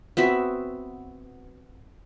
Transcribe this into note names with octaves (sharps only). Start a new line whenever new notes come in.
B3 C4 F#4 E5